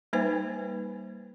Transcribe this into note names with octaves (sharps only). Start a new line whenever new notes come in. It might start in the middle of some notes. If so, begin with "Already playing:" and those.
G3 A#3 D#4 B4 C5 G#5